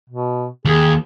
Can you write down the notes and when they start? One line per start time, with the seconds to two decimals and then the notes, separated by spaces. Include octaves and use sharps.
0.09 B2
0.65 D#2 G#4